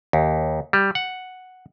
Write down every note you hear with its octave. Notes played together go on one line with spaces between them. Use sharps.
D#2
G3
F#5